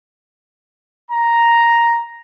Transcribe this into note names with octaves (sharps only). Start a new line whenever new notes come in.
A#5